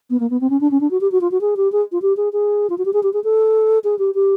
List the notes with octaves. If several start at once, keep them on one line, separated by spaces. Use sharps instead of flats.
B3
A#3
B3
C4
C#4
D4
C#4
D4
F#4
G4
F#4
F4
F#4
G#4
G4
G#4
F4
G4
G#4
G#4
F4
F#4
G4
G#4
G4
G#4
A4
G#4
G4
G4